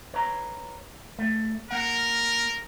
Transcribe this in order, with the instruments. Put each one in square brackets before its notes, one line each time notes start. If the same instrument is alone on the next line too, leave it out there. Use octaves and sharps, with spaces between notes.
[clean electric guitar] B4 C#5 A#5
A3
[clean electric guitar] A#3 F#5 [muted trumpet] A#4